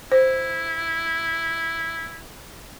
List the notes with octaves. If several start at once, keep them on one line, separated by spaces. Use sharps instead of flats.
E4 C5